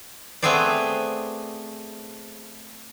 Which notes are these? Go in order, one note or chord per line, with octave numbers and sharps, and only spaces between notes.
A3 B3 C4 G#4 C5 D5